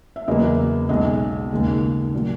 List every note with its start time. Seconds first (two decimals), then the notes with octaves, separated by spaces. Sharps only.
0.16 E5
0.28 E2 C#3 F#3 A#3 D#5
0.89 B1 B2 G#3 D#5
1.51 D#2 C#3 G#3
2.14 A#2 F#3